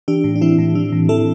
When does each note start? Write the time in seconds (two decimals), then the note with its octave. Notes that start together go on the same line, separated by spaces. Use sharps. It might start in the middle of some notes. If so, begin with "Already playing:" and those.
0.08 E3 D4 G4
0.24 A2
0.36 D4
0.41 E3 C4 E4
0.58 A2
0.75 E3 D4
0.92 A2
1.09 E3 E4 A4